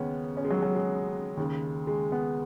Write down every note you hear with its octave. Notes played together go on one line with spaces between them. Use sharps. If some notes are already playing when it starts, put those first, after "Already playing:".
Already playing: D#2 C#3 G#3 B3 C#4
C#4
G#3
F#3
F#3
G#3
D#2 C#3
G#3
B3